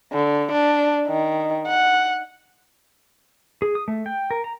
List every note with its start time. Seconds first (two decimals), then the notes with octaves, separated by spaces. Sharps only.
0.13 D3
0.52 D4
1.08 D#3
1.67 F#5
3.62 G#4
3.75 D#6
3.88 A3
4.06 G5
4.31 A#4
4.44 A#5